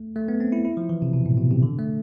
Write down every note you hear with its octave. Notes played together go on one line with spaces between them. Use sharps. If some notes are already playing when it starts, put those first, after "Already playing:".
Already playing: A3
A3
B3
C4
E4
E4
F3
E3
C3
B2
A2
B2
C3
D3
A3